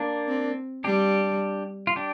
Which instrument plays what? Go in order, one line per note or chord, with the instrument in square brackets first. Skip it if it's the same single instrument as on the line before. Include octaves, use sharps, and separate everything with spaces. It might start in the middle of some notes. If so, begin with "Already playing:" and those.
Already playing: [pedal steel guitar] A#3 D4
[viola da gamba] C4
[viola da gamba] G3 [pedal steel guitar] D4 G4
[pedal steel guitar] F4
D4 G4